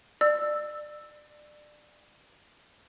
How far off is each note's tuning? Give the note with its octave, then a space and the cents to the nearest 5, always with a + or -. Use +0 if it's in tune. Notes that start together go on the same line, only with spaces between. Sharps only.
D5 +25 E6 +0